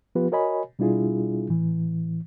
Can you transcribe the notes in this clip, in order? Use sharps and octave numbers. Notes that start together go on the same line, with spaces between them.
F3 B3 F4 G4 B4
F#4 A#4 C#5 D#5 G#5 B5
B2 G3 D4 E4 F4 G#4
A2 E3